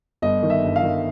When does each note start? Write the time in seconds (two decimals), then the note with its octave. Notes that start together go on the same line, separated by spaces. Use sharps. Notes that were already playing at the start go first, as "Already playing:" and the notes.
0.22 G1 D#5
0.43 D#3
0.50 E5
0.63 G2
0.76 F5
0.83 D#3